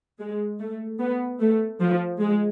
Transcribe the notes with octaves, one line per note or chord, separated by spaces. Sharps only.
G#3
A3
B3
A3
F3
G#3